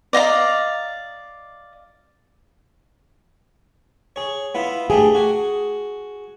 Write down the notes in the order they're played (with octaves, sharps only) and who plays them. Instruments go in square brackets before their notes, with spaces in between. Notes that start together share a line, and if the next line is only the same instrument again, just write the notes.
[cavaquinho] D5 D#5 F5 A#5
[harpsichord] G#4 C#5
B3 E4 F4
[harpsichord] A3 D4 G4 [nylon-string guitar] G#4
[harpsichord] F#4 G#5